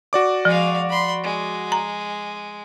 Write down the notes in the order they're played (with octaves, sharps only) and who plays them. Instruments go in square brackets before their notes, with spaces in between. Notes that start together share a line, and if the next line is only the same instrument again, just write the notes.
[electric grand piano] F#4 D5 D6
[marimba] F3 [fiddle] G#3 F5
[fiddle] B5 C6
G#3
[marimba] A#5